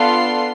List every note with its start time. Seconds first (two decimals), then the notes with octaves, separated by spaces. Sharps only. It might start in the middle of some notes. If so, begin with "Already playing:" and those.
Already playing: B3 D4 F4 A4 C6